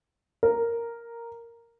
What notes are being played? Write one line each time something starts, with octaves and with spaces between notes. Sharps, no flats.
A#4